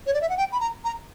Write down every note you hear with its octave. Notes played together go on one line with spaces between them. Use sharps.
C#5
D5
E5
F#5
G5
B5
A#5
A#5